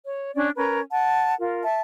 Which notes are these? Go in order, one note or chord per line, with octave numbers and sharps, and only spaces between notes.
C#5
C#4 D4 D5
C#4 A#4 B4 A#5
F#5 A5
F4 A#4
E5 A5